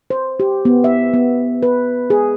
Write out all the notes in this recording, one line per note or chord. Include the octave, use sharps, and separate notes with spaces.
C5
G4
B3
E5
B3
B4
G#4